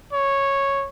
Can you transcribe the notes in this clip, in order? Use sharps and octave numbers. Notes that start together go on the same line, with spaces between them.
C#5